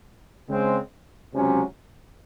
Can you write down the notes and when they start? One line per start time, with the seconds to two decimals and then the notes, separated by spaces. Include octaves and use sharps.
0.49 C#3 G#3 C4
1.32 C#2 C3 F#3 C#4